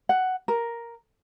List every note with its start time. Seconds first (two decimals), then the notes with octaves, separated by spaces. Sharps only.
0.09 F#5
0.48 A#4